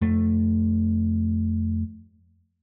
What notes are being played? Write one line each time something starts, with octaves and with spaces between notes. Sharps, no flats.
F2 A3